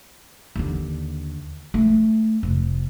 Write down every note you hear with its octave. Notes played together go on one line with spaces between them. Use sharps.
D#2 D3
A3
F1